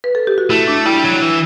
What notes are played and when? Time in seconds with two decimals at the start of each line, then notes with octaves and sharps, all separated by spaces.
0.04 B4
0.15 A4
0.27 G4
0.38 F#4
0.50 A3 E4
0.68 D4
0.86 G3 E4
1.04 F#3
1.22 E3